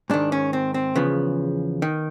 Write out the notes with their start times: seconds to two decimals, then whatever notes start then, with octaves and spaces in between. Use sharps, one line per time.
0.10 G#2 D#3 D4
0.32 C#4
0.53 C4
0.74 C4
0.95 E2 C#3 F3 B3
1.82 D#3